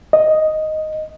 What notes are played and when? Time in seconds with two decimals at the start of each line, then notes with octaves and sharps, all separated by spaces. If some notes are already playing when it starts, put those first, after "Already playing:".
0.13 D#5